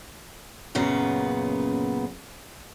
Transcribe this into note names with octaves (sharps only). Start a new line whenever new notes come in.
F#2 A#2 C#3 B3